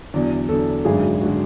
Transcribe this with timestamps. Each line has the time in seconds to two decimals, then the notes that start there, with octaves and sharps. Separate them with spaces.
0.14 E2 D3 F#3 D5
0.49 E2 D3 F#3 A4
0.85 G#1 F#2 D3 G#3 G#4
1.21 D3 G#3 F#4